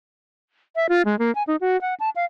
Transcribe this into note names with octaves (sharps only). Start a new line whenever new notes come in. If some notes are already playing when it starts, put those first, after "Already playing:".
E5
F4
G#3
A#3
G#5
D#4
F#4
F#5
A5
F5